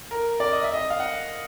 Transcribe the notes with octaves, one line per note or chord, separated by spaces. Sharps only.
A#4
D5
D#5
E5
D#5
F5
F#5